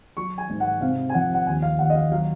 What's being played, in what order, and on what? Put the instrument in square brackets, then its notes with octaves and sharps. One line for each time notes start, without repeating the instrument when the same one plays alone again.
[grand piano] F#3 C#6
G#5
G#2
F#5
C3 F5
G#5
F2 F#5
F#5
D#2 G#5
F5
D#2 F#5
D#5
F5
F#3 F5